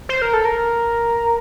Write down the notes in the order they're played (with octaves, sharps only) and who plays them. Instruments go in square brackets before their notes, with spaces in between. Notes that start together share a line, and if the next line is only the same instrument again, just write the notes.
[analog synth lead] C5
A#4
A4
A#4